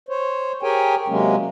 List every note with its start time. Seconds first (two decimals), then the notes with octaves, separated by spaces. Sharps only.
0.09 C5 C#5
0.63 G4 G#4 A#4 C#5 G5 G#5
1.08 C3 F#3 G#3 A#3 C#4